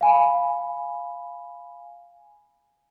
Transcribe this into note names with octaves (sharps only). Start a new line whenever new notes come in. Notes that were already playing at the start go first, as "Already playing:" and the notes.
F5 G#5 B5